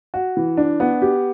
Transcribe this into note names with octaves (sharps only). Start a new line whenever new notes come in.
F#4
E3
D4
B3
G4